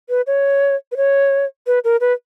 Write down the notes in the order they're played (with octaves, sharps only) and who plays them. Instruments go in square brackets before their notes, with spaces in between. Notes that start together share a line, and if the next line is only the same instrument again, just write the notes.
[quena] B4
C#5
B4
C#5
B4
A#4
B4